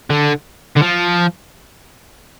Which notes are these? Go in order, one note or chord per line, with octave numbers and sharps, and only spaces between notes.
D3
D3
F3